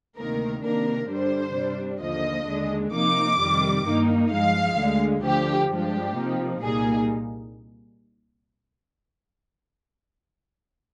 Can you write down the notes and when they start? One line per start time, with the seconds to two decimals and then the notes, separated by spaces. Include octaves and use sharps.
0.17 D2 C3 D#3 A#3 A#4
0.64 C3 D#3 A#3 D4 A#4
1.10 G2 D3 G3 D4 C5
1.56 C3 G3 D4
2.02 D#2 D3 F3 A#3 D#5
2.48 D#2 D3 G#3 D4
2.94 C3 F3 A#3 D#4 D6
3.40 F2 C3 D#3 G3
3.85 G2 D#3 A#3 D#4
4.32 G2 F3 G#3 F5
4.79 D2 D3 G#3
5.24 D2 D3 F3 G4
5.70 G2 F3 G#3 D4 G4
6.16 C3 F3 A#3 D#4
6.62 C2 A#2 G3 A#3 D#4 G#4